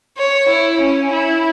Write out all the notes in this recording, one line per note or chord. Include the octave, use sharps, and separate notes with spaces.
C#5
E4
C#4
E4